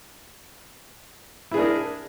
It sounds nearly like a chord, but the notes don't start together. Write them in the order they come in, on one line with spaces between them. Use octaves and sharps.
E4 G#4 D4 A#4